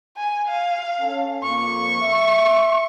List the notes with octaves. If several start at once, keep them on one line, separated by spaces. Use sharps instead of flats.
G#5
F5
C#4 A4
F2 A#3 C#6
E5